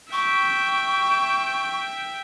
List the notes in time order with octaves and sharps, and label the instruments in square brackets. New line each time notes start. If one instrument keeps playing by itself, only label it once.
[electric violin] E5 G5 [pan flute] C#6